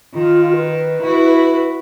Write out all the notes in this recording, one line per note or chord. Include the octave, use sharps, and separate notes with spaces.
D#3 F4
B4
E4 F#4